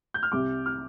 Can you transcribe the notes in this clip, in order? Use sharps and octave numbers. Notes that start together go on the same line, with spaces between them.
G6
F6
C2 C3 G3 D6
F6